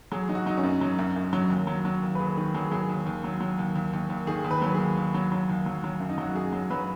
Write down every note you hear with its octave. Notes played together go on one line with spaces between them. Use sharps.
F#3 G#4
F#3 D#4
F#4
F#3 D#4
C#4
F#2
F#3
F#2
F#2
F#3
D#2
F#3
F#3
D#2
B4
D#2 G#4
D#3
F#3 G#4
F#3 G#4
D#2
D#2
F#3
F#3
D#2
D#2
D#2
D#2
D#3 G#4
D#2
B4
F#3 B4
D#2 G#4
D#2
F#3
F#3
D#2
F#3
F#3
F#2
D#4
F#3 F#4
F#2 G#4
F#3
F#3 B4